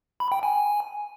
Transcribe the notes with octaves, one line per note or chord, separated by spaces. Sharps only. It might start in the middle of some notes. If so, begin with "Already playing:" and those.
B5
G5
G#5